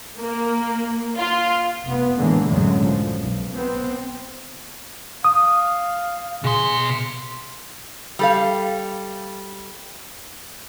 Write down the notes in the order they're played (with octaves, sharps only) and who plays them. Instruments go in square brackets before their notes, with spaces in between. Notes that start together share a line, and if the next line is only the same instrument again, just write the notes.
[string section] A#3
F4
[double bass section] F1 B3
A2 D3 E3 G#3 A#3
C2 F#2 A2 D3 F#3 G#3
F3
B1
B3 C4
[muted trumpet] F5 [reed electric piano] D#6
[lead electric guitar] B2 C6 [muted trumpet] G#4
[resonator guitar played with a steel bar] G3 A4 F5